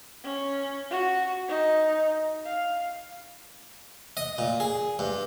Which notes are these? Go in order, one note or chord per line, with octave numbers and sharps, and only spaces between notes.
C#4
F#4
D#4
F5
D#5
A#2
G#4
G2